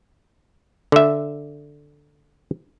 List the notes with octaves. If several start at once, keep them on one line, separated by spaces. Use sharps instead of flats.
D3 E5